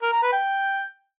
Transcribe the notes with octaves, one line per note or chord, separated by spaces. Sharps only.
A#4
A#5
B4
G5